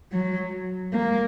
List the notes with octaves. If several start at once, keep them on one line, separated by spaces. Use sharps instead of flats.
F#3
A#3